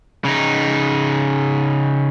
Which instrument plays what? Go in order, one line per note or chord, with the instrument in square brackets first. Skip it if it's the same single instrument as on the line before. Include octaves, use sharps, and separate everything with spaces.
[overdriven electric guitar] C#3 D#4